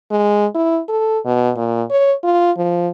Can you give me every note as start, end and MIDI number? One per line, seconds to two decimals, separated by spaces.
0.11 0.46 56
0.55 0.80 64
0.89 1.19 69
1.25 1.52 47
1.57 1.83 46
1.91 2.14 73
2.24 2.52 65
2.57 2.89 53